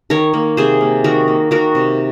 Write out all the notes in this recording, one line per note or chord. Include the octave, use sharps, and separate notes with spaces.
D#3 A#4 C#5
A#3
C3 G#4 C5
A#3
D#3 F#4 A#4
A#3
D#3 F#4 A#4
C3